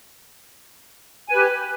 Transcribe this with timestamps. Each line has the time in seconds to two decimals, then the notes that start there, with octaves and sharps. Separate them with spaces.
1.29 G#5
1.33 B4
1.36 G4